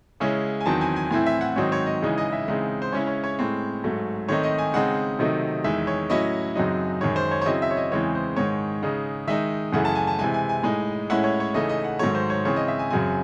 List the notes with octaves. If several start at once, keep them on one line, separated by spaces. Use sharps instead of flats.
C#3 G#3 C#4 E4
G#5
E2 D#3 F#3 C4 A5
G#5
G#5
A2 E3 C4 E4 G#5
E5
F#5
G#2 D#3 F#3 C4 D#4 C#5
C#5
D#5
C#3 E3 G#3 D#4
D#5
E5
C#3 E3 G#3 C4 D#4
C5
C#3 G#3 C#4 E4 C#5
C#5
C#5
A2 G#3 C4
G#2 F#3 A3
D#3 A3 C4 D#4 C#5
D#5
G#5
C#3 G#3 C4 D#4 F#5
C3 D#3 F#3 A3 D#4
E2 D#3 G#3 E5
C#5
A2 F#3 C#4 E4 D#5
F#2 C#3 F#3 C4 D#4
F#2 D#3 G#3 C#5
C5
C#5
C#5
C#3 F#3 C4 E4 D#5
E5
C#5
D#5
E2 C#3 E3 G#3 C4 C#5
C5
G#2 D#3 G#3 C#5
C#3 G#3 D#4
D#3 G#3 D#4 E5
F#2 C#3 E3 A3 F#5
A5
G#5
A5
C3 E3 G#3 G#5
G#5
G#5
A2 G#3 D#4
A2 G#3 C#4 E4 F#5
C#5
C#5
C#3 E3 A3 D#4 D#5
D#5
F#5
G#2 D#3 F#3 A3 C#5
C5
C#5
C#3 E3 C4 C#5
D#5
E5
G#5
F#2 C#3 F#3 C4 G#5